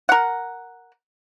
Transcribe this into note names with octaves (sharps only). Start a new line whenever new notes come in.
A#4 F#5